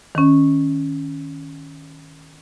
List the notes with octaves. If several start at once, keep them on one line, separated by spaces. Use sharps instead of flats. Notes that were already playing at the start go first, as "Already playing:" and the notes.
D#3 C#4